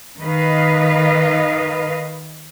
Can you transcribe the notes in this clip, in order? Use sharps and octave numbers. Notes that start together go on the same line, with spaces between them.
D#3 B4 D#5 F5